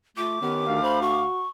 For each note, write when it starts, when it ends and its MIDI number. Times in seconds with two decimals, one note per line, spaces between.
0.17 0.39 57
0.17 0.41 65
0.17 1.22 86
0.42 0.81 51
0.42 0.65 59
0.42 0.65 61
0.42 0.78 67
0.67 1.24 38
0.67 1.24 77
0.83 1.00 72
0.83 1.02 83
1.02 1.44 66
1.02 1.49 85